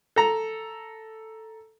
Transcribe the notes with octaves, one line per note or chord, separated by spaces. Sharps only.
A4 A#5